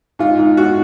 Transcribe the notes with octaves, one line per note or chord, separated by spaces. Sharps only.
G#2 F4
G#2
G#2 F#4